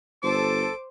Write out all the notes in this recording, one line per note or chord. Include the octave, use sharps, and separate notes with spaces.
G1 A4 C5 D6